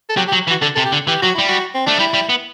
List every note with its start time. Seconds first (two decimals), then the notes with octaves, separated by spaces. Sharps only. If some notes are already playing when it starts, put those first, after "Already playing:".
0.09 A4
0.17 F#3 G4
0.28 G4
0.33 F#3
0.47 E3
0.51 F#4
0.62 D3 A4
0.75 C3 A4
0.85 G4
0.92 D3
1.07 E3 G4
1.22 F#3 F#4
1.35 G3 E4
1.49 F#4
1.74 C4
1.86 A3 D4
1.99 G3 E4
2.14 G3
2.29 B3